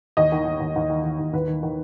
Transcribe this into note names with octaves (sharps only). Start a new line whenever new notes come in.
D#2 D#5
D#3
D#3
D#2
D#2
D#3
D#3
D#2
D#2 B4
D#3
D#3